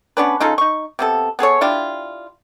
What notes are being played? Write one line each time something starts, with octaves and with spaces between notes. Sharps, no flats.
B3 C#4 D4 B4
C#3 D#4 F4 A4
D#4 C#6
C3 B3 A4
B3 G#4 A4 C#5
D4 E4 F4 G4